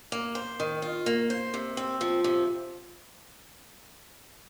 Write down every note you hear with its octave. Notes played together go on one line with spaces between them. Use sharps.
A#3
C5
D#3
F4
A#3
C5
C3
C4
F3
C3